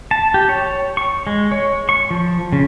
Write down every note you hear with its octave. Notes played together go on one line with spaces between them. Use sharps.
A5
G4
C#5
C#6
G#3
C#5
C#6
F3
C#3